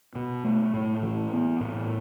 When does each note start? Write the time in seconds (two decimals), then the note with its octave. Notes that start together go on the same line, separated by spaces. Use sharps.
0.15 B2
0.44 A3
0.73 A2
1.03 E3
1.33 B3
1.60 A2